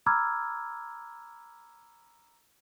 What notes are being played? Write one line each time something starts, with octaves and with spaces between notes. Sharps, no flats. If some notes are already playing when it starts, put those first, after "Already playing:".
A#5 B5 D6 E6 F6 G#6